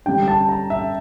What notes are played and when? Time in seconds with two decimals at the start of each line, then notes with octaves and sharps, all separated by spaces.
0.06 D3 G3 C#4 G5
0.28 A5
0.49 A#5
0.70 E5